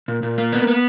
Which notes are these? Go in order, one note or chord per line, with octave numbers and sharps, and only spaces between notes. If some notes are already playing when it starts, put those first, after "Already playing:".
A#2
A#2
A#3
B3
B3